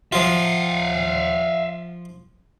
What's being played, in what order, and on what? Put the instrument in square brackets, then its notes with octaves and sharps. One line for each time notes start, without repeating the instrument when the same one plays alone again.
[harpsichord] F3 F4 [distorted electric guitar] E5 F5